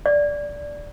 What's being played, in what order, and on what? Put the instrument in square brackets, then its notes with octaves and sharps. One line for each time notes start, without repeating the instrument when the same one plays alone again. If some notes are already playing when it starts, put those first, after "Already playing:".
[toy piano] D5